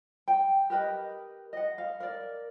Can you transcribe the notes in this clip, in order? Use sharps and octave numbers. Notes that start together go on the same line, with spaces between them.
G5
G4 A#4 B4 D#5
D#5 F#5
F5
A#4 D5